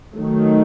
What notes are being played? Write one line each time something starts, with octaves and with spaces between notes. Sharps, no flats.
D#3 F#3 A3